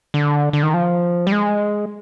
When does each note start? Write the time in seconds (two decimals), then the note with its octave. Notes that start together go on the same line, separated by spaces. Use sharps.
0.14 D3
0.53 D3
0.63 D#3
0.74 F3
1.27 G3
1.32 G#3